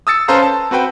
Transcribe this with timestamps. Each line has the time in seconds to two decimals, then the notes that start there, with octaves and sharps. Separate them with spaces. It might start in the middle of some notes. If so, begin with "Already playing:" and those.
0.07 D#6 E6 A6 C#7
0.28 C#4 A4 B4 C5 F5 A#5
0.42 A5
0.71 C4 F#4 B4 G5